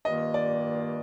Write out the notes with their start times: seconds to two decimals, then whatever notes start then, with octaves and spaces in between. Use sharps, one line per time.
0.05 G2 D#3 A#3 F4 D#5
0.34 D5